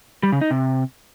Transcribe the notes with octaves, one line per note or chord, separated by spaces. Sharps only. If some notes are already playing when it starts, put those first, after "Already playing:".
G3
C#3
D#4
C3